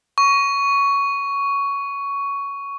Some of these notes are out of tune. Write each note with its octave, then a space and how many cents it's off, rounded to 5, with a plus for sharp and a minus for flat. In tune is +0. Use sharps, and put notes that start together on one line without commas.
C#6 +15